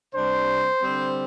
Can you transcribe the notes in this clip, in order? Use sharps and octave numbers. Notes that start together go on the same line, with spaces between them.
C3 G3 D4 C5
D3 G3 C4